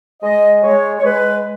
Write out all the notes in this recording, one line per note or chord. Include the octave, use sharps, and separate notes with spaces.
G#3 D#5
G#3 C#5
C#5
G#3 B4